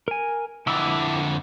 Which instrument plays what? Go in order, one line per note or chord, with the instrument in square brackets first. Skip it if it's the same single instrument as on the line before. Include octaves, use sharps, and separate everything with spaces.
[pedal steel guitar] A#4 G#5
[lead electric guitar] F2 D3 [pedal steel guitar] E4 D6 E6